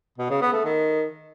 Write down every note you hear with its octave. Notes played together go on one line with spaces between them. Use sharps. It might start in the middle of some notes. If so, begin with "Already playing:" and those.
B2
C#3
B3
A3
D#3